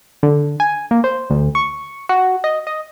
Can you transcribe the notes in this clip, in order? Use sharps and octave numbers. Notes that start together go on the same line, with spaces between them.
D3
G#5
A#3
C5
D2
C#6
F#4
D#5
D#5